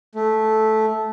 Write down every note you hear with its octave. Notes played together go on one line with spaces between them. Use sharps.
A3